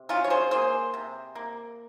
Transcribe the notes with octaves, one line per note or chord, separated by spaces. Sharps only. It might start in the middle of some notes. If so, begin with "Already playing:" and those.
Already playing: C3
F#3 C#4 F4
C#5
G#4 C5
A#3 G#4 C5
C3
A#3